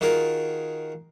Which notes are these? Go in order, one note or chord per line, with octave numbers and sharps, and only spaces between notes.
D#3 F4 F#4 G#4 A#4